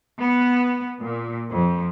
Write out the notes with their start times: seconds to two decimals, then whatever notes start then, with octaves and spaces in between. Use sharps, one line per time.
0.18 B3
1.01 A#2
1.50 F2